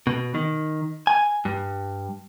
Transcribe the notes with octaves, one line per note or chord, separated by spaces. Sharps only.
B2
D#3
G#5
G2